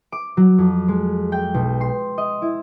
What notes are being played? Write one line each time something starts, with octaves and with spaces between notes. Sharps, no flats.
D6
F#3
F2
G#3
G5
B1
C6
D#5
E4